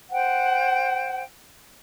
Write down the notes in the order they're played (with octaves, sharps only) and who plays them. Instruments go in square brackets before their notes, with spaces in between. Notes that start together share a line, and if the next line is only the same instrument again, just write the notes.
[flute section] C5 F#5 G5